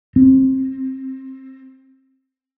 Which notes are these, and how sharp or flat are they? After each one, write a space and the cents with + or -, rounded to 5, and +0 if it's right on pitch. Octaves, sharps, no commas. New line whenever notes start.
C4 +20